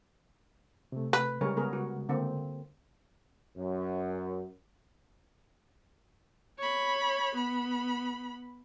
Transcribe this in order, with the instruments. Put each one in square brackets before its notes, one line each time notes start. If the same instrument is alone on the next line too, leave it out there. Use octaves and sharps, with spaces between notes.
[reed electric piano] C3 A3
[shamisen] B4
[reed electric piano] C#3 G#3 [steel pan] G3 A#4 C#5
[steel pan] B3 G#4 A#4
F#4
D3 A#3 C4
[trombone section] F#2
[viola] C#5 B5
B3 B5